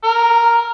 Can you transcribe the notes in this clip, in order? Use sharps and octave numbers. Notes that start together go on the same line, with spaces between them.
A#4